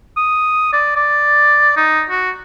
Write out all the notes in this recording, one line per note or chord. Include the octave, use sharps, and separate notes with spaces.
D#6
D5
D5
D#4
F#4